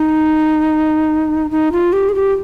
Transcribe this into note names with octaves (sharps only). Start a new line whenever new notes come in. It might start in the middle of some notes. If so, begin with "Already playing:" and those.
Already playing: D#4
D#4
F4
G4
G#4
G4